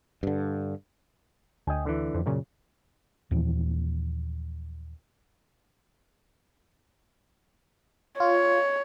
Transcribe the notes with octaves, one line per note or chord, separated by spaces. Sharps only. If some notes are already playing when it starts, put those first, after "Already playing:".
G2 D3
D2 D#5 G5 G#5
D3 E3
F2
F#2 A#2 C#3
D#2 A#2 E3 F3
F4 C#5